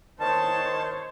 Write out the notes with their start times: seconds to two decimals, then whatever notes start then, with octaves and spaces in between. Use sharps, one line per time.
0.20 D#3 C5 C#5 A5